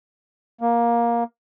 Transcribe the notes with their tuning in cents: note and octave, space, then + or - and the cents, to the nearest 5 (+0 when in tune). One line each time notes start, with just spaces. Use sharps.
A#3 +15